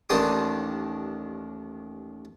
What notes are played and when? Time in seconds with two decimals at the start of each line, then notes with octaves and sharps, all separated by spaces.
0.09 A1 D#2 D#3 D4 C6 D#6